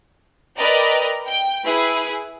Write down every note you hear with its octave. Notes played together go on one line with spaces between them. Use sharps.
A#4 B4 D5 D#5 G5 A#5
G5 G6
E4 G#4 B4